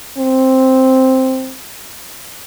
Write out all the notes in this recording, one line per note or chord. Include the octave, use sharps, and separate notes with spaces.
C4